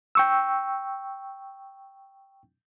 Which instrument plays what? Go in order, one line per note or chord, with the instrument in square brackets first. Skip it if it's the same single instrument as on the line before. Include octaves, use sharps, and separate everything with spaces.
[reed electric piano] G5 C#6 E6